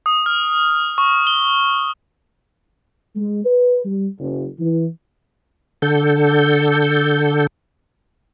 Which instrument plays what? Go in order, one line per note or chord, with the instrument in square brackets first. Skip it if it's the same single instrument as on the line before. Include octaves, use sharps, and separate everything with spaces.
[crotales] D#6
F6
C#6
G7
[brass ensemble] G#3
B4
G3
F#1
E3
[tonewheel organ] D3 A4 G6